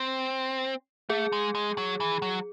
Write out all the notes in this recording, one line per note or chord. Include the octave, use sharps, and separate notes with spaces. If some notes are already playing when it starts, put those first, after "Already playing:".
Already playing: C4
A3 G#4
G#3
G#3
F#3
E3
F#3